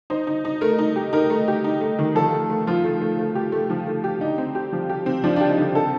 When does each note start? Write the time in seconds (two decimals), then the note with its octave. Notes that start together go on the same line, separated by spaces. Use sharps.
0.10 D#4 C5
0.27 D#4
0.45 D#4
0.61 A3 A#4
0.79 D#4
0.96 G4
1.13 D#4 A#4
1.30 A3
1.48 G4
1.64 D#4
1.81 A3
1.99 D#3
2.15 F3 A4
2.32 A3
2.50 A3
2.67 F3 F4
2.84 A3
3.01 A3
3.19 A3
3.35 G4
3.52 A3
3.70 F3
3.87 A3
4.04 G4
4.21 D3 D#4
4.38 C4
4.55 G4
4.72 F3
4.89 G4
5.06 C4
5.24 F3 D4
5.36 D4 G4
5.49 D#4
5.57 D3
5.75 D3 A4